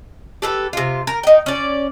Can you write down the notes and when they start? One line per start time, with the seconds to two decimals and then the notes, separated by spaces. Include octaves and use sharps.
0.42 G4 A4 B4
0.73 C3 F4
1.07 A#4
1.23 D#4 G5
1.46 C#4 D5